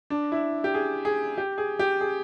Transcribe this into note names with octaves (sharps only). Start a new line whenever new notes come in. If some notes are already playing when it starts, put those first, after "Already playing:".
D4
E4
G4
G#4
G#4
G4
G#4
G4
G#4